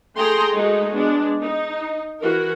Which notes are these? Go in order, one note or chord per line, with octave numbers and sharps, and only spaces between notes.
A3 G#4 G5 A#5 C6
G#3 A3 D#4 F#4 G#4
G#3 B3 D4
D#4
E3 F#4 A#4